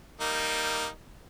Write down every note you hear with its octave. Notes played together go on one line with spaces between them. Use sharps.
G3 A#3 D#4